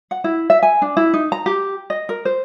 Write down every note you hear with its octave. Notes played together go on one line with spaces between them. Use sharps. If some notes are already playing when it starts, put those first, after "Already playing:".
F#5
E4
E5
G#5
D4
E4
D#4
A#5
G4
D#5
A#4
C5